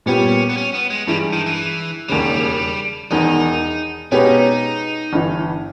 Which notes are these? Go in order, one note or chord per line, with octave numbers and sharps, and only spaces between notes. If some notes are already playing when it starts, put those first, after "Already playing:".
A#2 G3 B3 C#4 G4
B3
C#4
B3
G#3
G2 E3 G3 G#3
D#3
E3
E1 D#2 C#3 G3
E1 E2 D#3 D#4
B2 G#3 C#4 D#4 G4 B4
G1 G2 E3